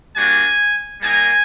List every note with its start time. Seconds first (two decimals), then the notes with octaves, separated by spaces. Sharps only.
0.15 G3 A#3 D4 F#4 G#5
1.01 G3 A#3 D#4 G#5